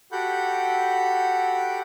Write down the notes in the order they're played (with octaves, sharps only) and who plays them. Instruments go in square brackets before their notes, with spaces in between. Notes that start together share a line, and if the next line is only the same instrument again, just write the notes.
[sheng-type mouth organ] F#4 G4 A4 F#5 B5 G6